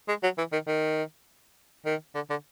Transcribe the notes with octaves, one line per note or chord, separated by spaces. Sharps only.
G#3
F#3
E3
D#3
D#3
D#3
D3
D3